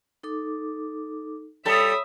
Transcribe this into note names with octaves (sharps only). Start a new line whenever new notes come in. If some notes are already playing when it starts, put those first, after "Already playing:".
D#4 A4 D6
G3 A4 C#5 E5 B5 D#6